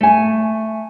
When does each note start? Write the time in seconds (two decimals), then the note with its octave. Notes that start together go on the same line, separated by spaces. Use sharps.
0.01 A3 G#5